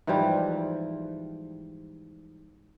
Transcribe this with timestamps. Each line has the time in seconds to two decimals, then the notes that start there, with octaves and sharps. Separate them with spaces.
0.07 G#2 E3 F3 G3